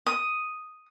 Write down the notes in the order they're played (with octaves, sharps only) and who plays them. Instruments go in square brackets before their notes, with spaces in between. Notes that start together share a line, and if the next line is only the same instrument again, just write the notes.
[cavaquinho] D#6